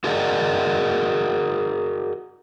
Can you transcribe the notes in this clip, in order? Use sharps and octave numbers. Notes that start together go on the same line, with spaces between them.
F#4 G#4 A#4 D5 D#5 F#5